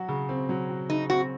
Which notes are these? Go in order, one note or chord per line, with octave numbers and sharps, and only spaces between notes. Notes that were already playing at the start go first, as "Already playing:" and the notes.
Already playing: F#3 F#4
C#3
C4
F#3
F#4
C#3 D#4
C4 F#4